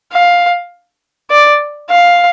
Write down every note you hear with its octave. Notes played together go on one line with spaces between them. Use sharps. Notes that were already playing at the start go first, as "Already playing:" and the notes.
F5
D5
F5